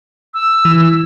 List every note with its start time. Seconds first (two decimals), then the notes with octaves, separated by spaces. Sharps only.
0.34 E6
0.65 E3